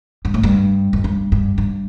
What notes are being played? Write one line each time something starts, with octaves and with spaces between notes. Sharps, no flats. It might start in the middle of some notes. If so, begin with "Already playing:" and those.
G2
A2
G2
F2
G2
G2
G2